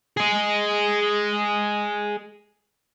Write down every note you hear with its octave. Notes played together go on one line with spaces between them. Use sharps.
G#4 D#5